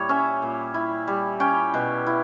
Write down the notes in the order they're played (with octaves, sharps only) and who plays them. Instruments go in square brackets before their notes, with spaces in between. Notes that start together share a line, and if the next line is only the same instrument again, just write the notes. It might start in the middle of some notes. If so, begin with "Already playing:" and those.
Already playing: [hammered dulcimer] A#2 G3 E4 C#5
C#4 E5
A#2
E4
G3
C#4 G5
B2
E4